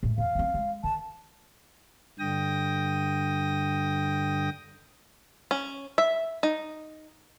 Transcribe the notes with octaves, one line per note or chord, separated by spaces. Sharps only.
A2 G#3
E2 F5
F#3 C4
G#3
D#3 A5
G2 D3 G5 D#6 A#6
C#4
E5
D#4